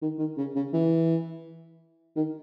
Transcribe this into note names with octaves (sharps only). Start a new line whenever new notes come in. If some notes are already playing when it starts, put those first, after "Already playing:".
D#3
D#3
C#3
C#3
E3
D#3